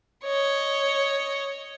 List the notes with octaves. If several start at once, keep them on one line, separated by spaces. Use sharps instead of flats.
C#5 D#5